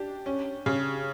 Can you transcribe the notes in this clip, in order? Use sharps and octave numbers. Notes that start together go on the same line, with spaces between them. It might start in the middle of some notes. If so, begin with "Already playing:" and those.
Already playing: D4 G4
C#4
C#3